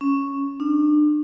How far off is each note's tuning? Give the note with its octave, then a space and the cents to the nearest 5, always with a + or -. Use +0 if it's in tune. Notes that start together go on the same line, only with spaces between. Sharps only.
C#4 +0
D4 +35